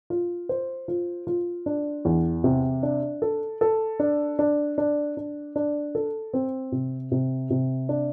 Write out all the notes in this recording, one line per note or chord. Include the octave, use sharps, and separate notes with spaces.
F4
C5
F4
F4
D4
E2
C3
D4
A4
A4
D4
D4
D4
D4
D4
A4
C4
C3
C3
C3
D4